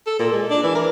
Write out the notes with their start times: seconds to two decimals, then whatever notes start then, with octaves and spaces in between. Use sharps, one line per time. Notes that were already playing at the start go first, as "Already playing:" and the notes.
0.06 A4
0.19 A#2
0.32 G#3
0.50 D4
0.63 E3
0.75 A#4